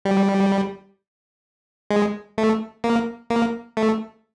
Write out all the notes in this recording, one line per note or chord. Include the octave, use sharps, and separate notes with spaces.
G3
G#3
A3
A#3
A#3
A3